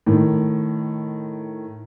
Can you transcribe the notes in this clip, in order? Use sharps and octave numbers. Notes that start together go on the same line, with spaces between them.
A2 D#3